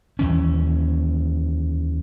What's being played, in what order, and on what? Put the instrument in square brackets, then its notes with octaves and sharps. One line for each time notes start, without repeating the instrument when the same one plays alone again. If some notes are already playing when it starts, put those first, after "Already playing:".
[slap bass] D#2 E3 C#4